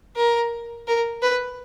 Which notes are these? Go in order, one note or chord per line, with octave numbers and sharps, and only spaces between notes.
A#4
A#4
B4